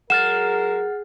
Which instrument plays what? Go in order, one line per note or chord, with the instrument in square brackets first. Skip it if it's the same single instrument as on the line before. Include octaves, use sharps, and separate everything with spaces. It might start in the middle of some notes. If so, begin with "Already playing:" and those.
[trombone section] F#3 A#4 [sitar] G#3 [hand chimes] F#5 F6 A6 [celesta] E7